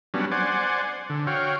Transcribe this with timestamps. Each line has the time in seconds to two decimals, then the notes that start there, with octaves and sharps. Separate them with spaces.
0.14 F#3 G3 B3 C#4 D4
0.32 C5 D5 F#5 G#5
1.10 D3
1.27 F#4 C#5 F5 G5